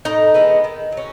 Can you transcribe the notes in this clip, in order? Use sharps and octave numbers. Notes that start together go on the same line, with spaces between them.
A2 D#4 D#5
E3 G#3 B3
D#3
F#3 C#4